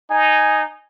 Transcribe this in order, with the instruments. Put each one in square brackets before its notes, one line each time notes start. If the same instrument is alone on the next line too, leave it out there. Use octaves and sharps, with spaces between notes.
[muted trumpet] D#4 [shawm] G#5